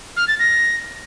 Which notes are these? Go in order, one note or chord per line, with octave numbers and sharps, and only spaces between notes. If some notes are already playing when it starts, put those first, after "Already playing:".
F6
A6
A#6